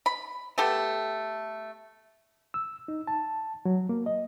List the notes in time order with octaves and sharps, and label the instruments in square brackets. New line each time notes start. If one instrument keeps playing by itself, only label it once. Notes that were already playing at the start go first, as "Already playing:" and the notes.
[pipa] B5
A3 B3 G4 A4
[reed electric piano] E6
D#4
A5
F#3
A#3
D#5